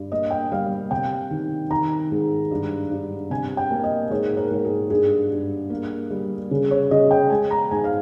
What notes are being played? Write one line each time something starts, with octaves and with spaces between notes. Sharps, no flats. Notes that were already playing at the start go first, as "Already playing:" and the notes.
Already playing: G2
A#3 D#5
G5
G3 F5
C3 G5
D#3
D#3 A#5
G#2
G2
G2
C3 G#5
G5
A#3
D#5
G#2 C#5
A#4
G#2
G#4
G2 G#4
G2
A#3
G3
C#3
C#5
C#3 D#5
G5
G#3 G#5
A#5
G#2 G#5
F5